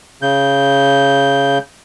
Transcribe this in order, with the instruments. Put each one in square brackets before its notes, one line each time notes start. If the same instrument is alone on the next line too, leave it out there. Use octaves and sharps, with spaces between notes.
[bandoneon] C#3 G6